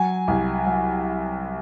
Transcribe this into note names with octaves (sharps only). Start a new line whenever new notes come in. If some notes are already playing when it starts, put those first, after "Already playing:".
Already playing: F#3 G#5
C2
F#3